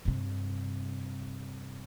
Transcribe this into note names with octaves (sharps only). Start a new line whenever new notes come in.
G2 C3